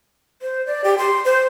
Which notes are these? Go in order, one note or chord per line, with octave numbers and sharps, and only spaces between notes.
C5
D5
G4
C6
C5